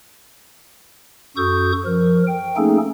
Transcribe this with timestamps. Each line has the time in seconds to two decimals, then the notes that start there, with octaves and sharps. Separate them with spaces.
1.37 F#2 F#4 A4 C#6 D#6 G6
1.86 F3 A#4
2.27 G5
2.57 A3 A#3 C#4 D#4 G#4 A4